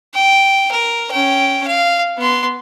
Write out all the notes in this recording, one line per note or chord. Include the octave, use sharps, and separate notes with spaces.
G5
A#4
C#4 G5
F5
B3 C6